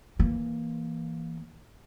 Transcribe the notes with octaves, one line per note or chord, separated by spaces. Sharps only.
E3 A#3